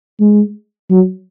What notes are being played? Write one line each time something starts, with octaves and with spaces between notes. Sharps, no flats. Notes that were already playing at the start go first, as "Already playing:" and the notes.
G#3
F#3